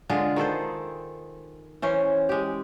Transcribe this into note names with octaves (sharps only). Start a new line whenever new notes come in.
D3 G#3 F4 G#4
D#3 G#4 A4 C5
E3 C#4 C5
G#3 G4